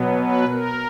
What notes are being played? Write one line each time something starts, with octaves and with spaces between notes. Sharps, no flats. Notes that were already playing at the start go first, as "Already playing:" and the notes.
Already playing: B2 F#3 B3
B4
A#4